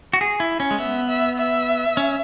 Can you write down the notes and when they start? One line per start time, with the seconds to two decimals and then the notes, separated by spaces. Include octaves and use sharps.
0.13 F#4
0.21 G#4
0.40 E4
0.60 C#4
0.71 G#3
0.79 B3 E5
1.08 E5
1.38 E5
1.97 C#4